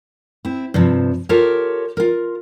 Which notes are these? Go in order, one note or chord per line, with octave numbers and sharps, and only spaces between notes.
C4 E4
G2 C3 F3
F4 G4 A4 A#4 C#5
F4 A#4